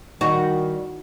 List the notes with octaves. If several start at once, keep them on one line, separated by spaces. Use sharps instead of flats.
D#3 G3 D#4 F#4